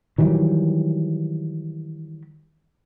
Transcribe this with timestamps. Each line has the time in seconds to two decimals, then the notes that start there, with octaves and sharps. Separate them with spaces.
0.18 D#3 E3 F#3 G3